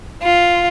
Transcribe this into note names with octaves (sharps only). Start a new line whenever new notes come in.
F4